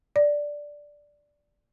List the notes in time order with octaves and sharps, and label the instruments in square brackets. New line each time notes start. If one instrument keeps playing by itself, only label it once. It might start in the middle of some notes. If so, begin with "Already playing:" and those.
[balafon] D5